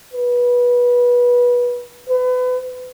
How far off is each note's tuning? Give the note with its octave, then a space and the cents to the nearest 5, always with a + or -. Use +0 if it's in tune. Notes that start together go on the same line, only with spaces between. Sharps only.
B4 -20
B4 +35